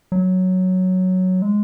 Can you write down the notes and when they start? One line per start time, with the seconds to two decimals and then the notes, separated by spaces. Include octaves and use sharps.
0.12 F#3
1.42 G#3